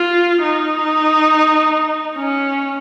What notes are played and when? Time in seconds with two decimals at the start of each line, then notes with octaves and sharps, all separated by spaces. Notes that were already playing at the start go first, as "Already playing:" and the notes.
Already playing: F4
0.42 D#4
2.16 C#4